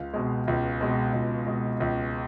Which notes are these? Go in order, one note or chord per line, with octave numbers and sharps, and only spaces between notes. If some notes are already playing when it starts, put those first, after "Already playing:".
Already playing: C#2 F5
B2 G#3
C#2
B2 G#3
C#2
B2 G#3
C#2